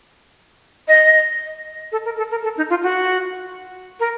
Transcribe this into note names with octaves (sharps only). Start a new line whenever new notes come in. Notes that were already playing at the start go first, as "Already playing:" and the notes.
D#5
A4
A#4
A4
A#4
A4
D#4
F4
F#4
A#4